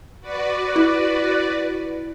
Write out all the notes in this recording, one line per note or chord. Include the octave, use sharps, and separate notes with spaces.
F#4 B4 D5
E4